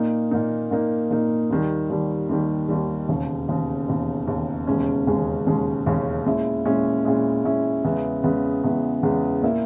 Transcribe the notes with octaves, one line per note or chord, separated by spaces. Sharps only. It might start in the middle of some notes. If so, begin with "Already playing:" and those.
Already playing: A#2 A#3 D#4
A#2 A#3 D#4
A#2 A#3 D#4
A#2 A#3 D#4
D#2 D#3 G3
D#2 D#3 G3
D#2 D#3 G3
D#2 D#3 G3
E1 D#2 C#3
E1 D#2 C#3
E1 D#2 C#3
E1 D#2 C#3
E1 D#2 C#3 G#3 C#4
E1 D#2 C#3 G#3 C#4
E1 D#2 C#3 G#3 C#4
E1 D#2 C#3 G#3 C#4
A#2 G#3 C#4 E4
A#2 G#3 C#4 E4
A#2 G#3 C#4 E4
A#2 G#3 C#4 E4
E2 C#3 G#3 B3 E4
E2 C#3 G#3 B3 E4
E2 C#3 G#3 B3 E4
E2 C#3 G#3 B3 E4
A#2 A#3 E4